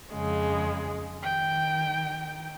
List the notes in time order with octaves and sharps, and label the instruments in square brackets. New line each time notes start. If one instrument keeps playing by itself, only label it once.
[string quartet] F2 C#3 G#3
[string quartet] D#3 [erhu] G5